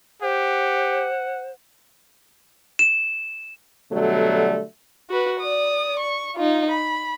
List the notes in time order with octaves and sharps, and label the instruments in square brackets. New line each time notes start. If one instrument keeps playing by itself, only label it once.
[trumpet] G4 [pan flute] C5 [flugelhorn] F#5
[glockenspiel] E7
[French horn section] B2 D3 F#3 G3 A3
[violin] F#4 B4
D5 D#6
C#6
D#4 F4
B5